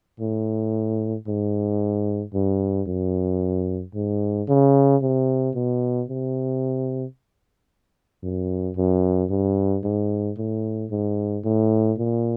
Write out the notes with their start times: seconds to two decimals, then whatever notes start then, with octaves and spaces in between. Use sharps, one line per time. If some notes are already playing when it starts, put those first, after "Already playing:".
0.20 A2
1.27 G#2
2.34 G2
2.87 F#2
3.94 G#2
4.48 C#3
5.02 C3
5.55 B2
6.08 C3
8.23 F#2
8.76 F#2
9.30 G2
9.84 G#2
10.37 A2
10.90 G#2
11.44 A2
11.98 A#2